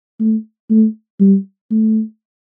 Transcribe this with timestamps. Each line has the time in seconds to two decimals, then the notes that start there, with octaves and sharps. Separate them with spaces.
0.20 A3
0.70 A3
1.20 G3
1.71 A3